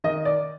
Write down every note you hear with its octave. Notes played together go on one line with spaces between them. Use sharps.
D#3 D#5
D5